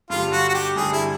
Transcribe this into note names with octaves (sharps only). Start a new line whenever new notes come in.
G2 D3 G3 F4
F#4
F#4
G4
G2 D3 G3 G#4
E4